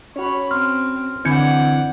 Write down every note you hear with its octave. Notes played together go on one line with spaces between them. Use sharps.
C#4 F#4 C#5 B5
C4 C6 F6
D3 E3 C4 D5 F#5 G6 G#6 C#7